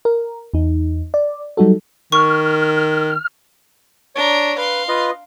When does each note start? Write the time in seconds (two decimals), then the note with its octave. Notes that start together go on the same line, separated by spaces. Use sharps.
0.05 A#4
0.54 E2 D#4
1.14 D5
1.57 F#3 G3 D#4 F#4 A4
2.12 D#3 C#6 F6
4.15 D4 C#5 A#5
4.58 B4 F5 C6
4.88 F4 B4 D#5